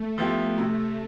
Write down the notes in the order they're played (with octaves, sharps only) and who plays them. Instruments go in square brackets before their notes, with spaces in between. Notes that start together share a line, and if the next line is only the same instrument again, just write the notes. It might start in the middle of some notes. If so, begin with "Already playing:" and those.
Already playing: [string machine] A3
[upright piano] F3 B3 E4 G4
C3